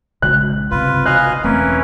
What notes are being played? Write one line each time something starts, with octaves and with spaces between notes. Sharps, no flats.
A#1 C#3 G#3 F#6
G1 C#2 C3 F4 B4
D#5 F5 G#5 F#6
E1 E3 A3 C4 C#4 A#4 B4